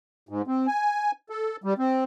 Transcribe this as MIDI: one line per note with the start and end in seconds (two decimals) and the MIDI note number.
0.29 0.42 44
0.47 0.67 60
0.67 1.11 80
1.30 1.56 69
1.64 1.74 55
1.78 2.04 60